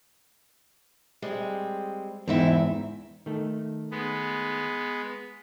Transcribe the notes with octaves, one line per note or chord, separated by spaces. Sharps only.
G3 G#3 C4
E2 G#2 C4 D#4 E4
D#3 A3
G#3 B3